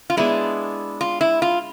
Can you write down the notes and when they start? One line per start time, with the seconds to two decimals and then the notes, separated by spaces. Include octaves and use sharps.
0.10 F4
0.17 G#3 B3 D4 E4 G#4
1.01 F4
1.21 E4
1.42 F4